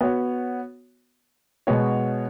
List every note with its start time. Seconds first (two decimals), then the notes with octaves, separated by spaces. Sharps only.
0.01 B3 F#4 C#5
1.67 B2 G#3 B3 F#4 C#5